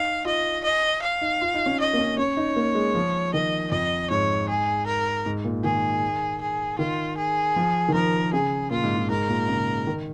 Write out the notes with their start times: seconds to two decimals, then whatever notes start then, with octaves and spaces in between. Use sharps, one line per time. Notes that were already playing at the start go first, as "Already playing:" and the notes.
Already playing: D#4 F5
0.25 F4 D#5
0.64 D#5
1.02 F5
1.21 D#4
1.41 F4
1.54 D#4
1.66 C#4
1.80 D#5
1.93 A#3
1.98 C#4
2.18 C#4 C#5
2.37 D#4
2.56 A#3
2.75 G#3
2.95 F3
3.34 D#3 D#5
3.71 F2 D#5
4.10 G#2 C#5
4.49 G#4
4.86 A#4
5.26 G#2
5.44 A#2
5.64 D#3 G#4
6.41 G#4
6.78 D#3 F4
7.17 G#4
7.56 F3
7.88 D#3
7.94 F3 A#4
8.33 C#3 G#4
8.71 A#2 F4
8.83 G#2
8.97 G#2
9.10 G#2 A#4
9.29 A#2
9.48 C#3
9.87 D#3